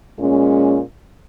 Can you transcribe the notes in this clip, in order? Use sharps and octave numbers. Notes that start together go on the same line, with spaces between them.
A#2 G#3 C#4